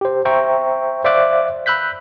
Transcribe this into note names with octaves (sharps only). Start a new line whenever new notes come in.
G4 C5
C5 E5 G5 A#5 C#6
C5 D5 E5 F5 D6 F#6
B5 E6 F#6 G6 B6